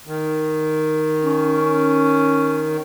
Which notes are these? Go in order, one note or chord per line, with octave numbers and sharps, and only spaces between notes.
D#3
C#4